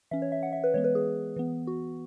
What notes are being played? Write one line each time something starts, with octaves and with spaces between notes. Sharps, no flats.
E3 C#4 E5
C#5
E5
F#5
E5
B4
E3 G#3 B3 C#5
B4
G#4
E3 B3
F#4